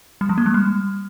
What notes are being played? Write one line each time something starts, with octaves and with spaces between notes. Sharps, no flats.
G3
F3
A#3
G#3
G3